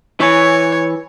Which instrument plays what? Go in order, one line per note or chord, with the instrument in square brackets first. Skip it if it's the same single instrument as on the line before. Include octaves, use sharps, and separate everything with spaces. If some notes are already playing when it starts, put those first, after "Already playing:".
[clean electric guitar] E3 [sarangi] C#5 [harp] G#5 C#6